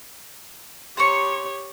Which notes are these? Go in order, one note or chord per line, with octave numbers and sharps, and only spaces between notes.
G4 C5 C#5 A#5 C#6